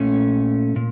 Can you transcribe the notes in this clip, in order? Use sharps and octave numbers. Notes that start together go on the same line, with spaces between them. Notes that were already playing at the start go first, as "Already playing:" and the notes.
Already playing: A#2 A3 C#4
A#2